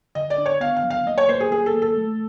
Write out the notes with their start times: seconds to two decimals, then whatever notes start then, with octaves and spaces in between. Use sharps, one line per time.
0.15 D3 D#5
0.30 D5
0.38 D4
0.46 C#5
0.61 B3 F5
0.76 F5
0.83 F#3
0.90 F5
1.06 A#3 D#5
1.18 C#5
1.29 A#3 C5
1.40 G#4
1.52 A#3 G#4
1.66 A4
1.74 A#3
1.82 A4
1.97 A3